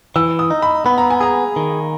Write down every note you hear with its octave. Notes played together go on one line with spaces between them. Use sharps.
E3 E6
D#6
D#4
B5
B3 B5
A#5
G#5
G#4 A#5
D#3